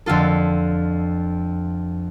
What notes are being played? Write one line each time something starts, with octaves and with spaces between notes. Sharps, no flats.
F2 D3 F4 A4